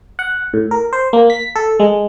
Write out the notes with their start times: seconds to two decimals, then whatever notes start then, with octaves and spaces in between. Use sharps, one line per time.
0.19 F#5
0.54 A2
0.71 A#4
0.93 C5
1.13 A#3
1.30 B6
1.56 A4
1.80 G#3